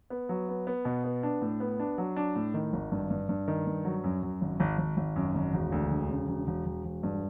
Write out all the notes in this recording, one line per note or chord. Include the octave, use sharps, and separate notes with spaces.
B3
F#3
B3
B3
B2
B3
D4
A2
B3
D4
F#3
D4
A2
D#3
G#1
G2
G2
G2
D#3
G2
F#3
F#2
F#2
G#1
G#1
G#1
G#1
F#2
G#1
E1
D2
E1
C#3
E1
E1
E1
E1
G2